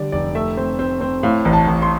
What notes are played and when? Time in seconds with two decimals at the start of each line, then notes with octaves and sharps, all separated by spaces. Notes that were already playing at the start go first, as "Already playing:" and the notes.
Already playing: D3 G3 D5
0.12 F1 D5
0.35 A3 E5
0.57 C4
0.79 C4
1.01 C4
1.23 A2 F5
1.45 A1
1.53 A5
1.68 A1
1.82 C6